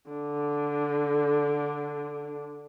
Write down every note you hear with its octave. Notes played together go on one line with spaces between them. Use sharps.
D3 D4